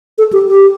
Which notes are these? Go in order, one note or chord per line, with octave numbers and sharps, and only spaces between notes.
A4
G4
G4